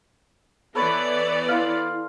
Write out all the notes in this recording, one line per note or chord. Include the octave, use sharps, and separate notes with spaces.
E3 B3 A4 B4 C#5 D5
E4 F5 C6